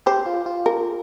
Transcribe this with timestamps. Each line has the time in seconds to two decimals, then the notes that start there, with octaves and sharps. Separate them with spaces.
0.06 G4 C5
0.26 F4
0.46 F4
0.66 A#4